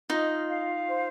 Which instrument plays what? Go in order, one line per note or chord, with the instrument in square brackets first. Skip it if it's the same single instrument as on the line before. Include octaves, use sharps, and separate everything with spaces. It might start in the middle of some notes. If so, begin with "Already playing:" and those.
[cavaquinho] D#4 D#5 [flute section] F4
[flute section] F5
C5